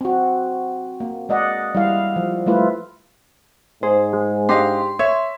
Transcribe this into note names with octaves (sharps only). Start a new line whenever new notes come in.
C4 F#4
A#3
G#3 D5 D#5 F#5
G3 E4 F5
F3
G3 A3 E4 F4 B4
G#2 G#4 C5
G#3
D4 G4 D#5 F5 C6
C#5 E5